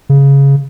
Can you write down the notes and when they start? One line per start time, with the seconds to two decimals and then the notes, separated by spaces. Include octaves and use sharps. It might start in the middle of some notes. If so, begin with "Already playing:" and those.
0.09 C#3